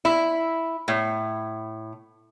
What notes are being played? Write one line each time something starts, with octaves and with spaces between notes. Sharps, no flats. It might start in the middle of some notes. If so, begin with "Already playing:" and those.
E4
A2